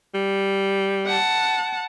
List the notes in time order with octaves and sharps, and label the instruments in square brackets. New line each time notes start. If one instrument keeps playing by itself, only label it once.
[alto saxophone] G3
[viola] F#5 A5